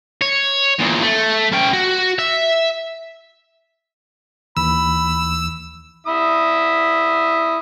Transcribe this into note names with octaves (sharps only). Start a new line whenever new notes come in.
C#5
E2 A#2
A3
C#4 G5
F#4
E5
D#2 E3 B5 E6
E4 E5 D#6